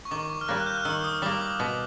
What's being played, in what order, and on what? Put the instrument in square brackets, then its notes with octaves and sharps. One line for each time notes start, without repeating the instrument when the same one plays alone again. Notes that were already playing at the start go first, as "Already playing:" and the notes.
[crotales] C#6
[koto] D#3 [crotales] D6
[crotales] C#6
F6
[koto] G3 A#3 [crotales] F#6
[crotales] F#6
G6
F6
[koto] D#3 [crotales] E6
[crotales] D#6
[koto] G3 A#3 [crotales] D6
[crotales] D6
[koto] B2 [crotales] D6